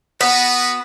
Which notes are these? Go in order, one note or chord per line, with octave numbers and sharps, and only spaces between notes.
B3 F#4 B4